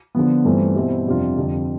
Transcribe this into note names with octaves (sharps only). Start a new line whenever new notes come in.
D3 F3 B3
G2 E3 A3 C4 F4
B2 G3 C4 E4
F2 C3 G3 D4 F4
F2 D3 G3